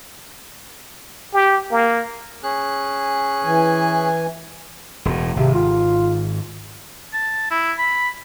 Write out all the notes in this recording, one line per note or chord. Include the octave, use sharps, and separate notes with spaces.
G4
A#3
C#4 G#4 F#6
E3 G#5
E1 A2
G#1 C3
F4
A5
E4
B5